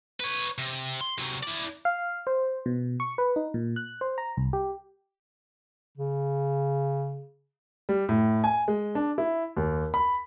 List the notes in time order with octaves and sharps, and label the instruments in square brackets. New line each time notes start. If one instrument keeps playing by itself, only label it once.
[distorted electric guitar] B4 C#5
C3
C6
C3 F#3
E4 D5
[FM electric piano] F5
C5
B2
C#6
B4
D#4
A#2
F#6
C5
A#5
C2
G4
[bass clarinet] C#3
[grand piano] G3
A2
G#5
G#3
D4
E4
D#2
B5